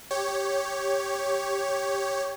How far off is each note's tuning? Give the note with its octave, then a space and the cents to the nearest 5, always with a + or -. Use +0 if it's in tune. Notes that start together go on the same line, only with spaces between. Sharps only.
G4 +0 C#5 +0